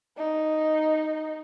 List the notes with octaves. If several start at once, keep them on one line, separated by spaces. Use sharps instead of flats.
D#4